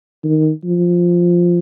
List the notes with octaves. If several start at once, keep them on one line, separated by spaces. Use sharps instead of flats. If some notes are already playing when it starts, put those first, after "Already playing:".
D#3
F3